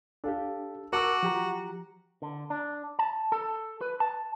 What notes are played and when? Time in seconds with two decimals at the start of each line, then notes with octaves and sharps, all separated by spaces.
0.24 D4 G4 A4 F5
0.93 F#4 A#4 A5 D6 E6
1.23 F3 G4 A#5
2.22 D3
2.50 D4
2.99 A5
3.32 A4
3.81 B4
4.00 A5